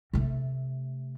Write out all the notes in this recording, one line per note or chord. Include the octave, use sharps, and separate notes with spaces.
C3 A3